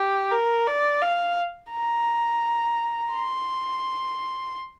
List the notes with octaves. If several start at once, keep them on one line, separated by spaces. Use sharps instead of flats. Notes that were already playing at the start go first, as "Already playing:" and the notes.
Already playing: G4
A#4
D5
F5
A#5
C6